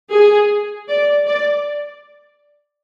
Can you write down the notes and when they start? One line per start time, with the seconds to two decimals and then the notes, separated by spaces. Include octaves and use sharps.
0.13 G#4
0.89 D5
1.27 D5